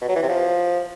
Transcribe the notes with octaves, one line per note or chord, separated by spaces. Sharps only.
B2
F#3
E3
C3
F3